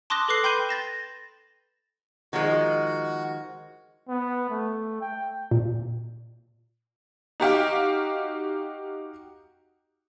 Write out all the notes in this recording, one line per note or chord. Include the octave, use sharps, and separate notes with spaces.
A5 C6 D6 D#6 F#6 A#6
A4 B4 D6 F#6 C7
G5 B5 C6 G6 C7 D#7
A6 A#6 E7
D#3 F3 G#3 F#4
B3
A3
G5
A#2
D#4 F#4 G4 F5